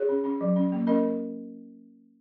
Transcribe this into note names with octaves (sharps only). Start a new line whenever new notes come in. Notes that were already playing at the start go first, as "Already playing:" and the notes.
Already playing: G#4 C#5
C#4
C#4
F#3
C#4
A#3
C#4 A#4 D#5